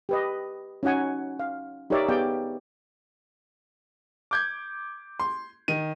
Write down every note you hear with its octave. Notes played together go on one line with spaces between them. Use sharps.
G4 B4 D#5
C#4 D#4 F#4 F#5 G#5
F5
D#4 G4 A#4 C#5 D5 E5
B3 G4 G#4 D5 F5 G5
D6 G6 G#6
C6
D#3 D#7